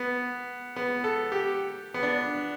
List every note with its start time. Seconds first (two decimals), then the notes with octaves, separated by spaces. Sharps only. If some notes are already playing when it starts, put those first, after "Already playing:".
Already playing: B3
0.76 B3
1.04 A4
1.32 G4
1.94 B3
2.03 D4